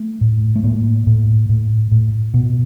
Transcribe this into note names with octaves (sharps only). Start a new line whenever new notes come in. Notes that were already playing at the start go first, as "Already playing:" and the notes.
Already playing: A3
A2
A3
A2 A#3
A2
A2
A2
B2